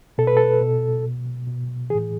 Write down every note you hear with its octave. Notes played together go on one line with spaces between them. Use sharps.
B2 A4
B4
A4
B2
B2
B2
A2 E3 G#4